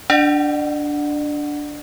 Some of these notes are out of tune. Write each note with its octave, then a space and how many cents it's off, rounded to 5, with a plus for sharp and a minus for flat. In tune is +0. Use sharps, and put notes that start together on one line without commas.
D4 -5 D5 +40 F#5 +0